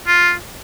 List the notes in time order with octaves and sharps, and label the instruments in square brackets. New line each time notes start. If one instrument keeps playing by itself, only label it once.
[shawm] F4